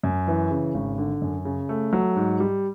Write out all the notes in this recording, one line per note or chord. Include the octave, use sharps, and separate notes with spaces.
F#2
E3
C#3
G#1
D3
F#2
C#3
A3
F#3
G#2
G3